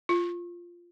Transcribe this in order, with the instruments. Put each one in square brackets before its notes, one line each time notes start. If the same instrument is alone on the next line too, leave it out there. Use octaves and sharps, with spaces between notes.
[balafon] F4